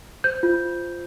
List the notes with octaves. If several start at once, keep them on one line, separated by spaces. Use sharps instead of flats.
C5 G6
F4